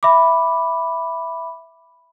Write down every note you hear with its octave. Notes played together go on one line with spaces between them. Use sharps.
E5 B5 D6